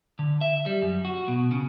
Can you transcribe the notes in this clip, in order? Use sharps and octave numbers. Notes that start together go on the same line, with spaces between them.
D3
E5
G3
F#2
F#4
B2
C#3